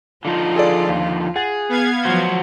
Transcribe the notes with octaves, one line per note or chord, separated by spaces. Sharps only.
D3 F3 D#4 F4
G#4 A4 D5
D#2
G#4 F#5 A6
B3 F5 G#6
F3 F#3 F#4 C5